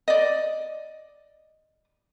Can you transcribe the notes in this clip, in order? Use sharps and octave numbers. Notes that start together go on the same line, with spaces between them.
D5 D#5